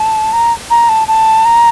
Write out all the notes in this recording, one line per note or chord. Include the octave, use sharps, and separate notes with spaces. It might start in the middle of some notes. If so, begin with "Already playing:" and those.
Already playing: A5
A#5
A#5
A5
A5
A#5